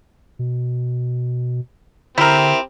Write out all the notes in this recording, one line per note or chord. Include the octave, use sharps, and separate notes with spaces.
B2
D3 C4 E4 G4 A#4